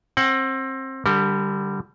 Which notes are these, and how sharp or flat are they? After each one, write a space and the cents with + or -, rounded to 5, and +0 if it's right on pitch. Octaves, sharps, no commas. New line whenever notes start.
C4 +25 F#5 +10
D3 +0 G3 +0 A#4 -35